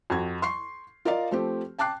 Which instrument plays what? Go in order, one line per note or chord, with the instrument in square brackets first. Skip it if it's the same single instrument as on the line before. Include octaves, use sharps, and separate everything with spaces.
[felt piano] F2 F#4 G#6
C6 C#6 C7
F4 A#4 D5 D#5 F5
F3 A3 C4 G4
G5 A5 D6 F#6 C7